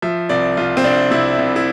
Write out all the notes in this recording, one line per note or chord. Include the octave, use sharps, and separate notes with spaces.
F3 E5
C2 D5
C2 F4
C4
C2 D4
C3 E4
C2
E4